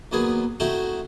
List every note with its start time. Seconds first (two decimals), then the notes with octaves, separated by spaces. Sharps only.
0.12 D#2 F#3 B3 G#4
0.60 A3 C4 D#4 E4 F#4